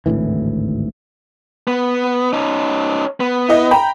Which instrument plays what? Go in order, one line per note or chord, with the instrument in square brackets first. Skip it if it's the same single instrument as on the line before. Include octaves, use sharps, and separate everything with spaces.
[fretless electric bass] G#1 D2 A2 E3
[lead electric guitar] B3
C#4 D#4
B3
[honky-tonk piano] E4 D#5
G5 A#5 B5